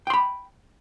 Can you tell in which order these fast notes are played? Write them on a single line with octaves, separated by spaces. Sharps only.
G5 C6 B5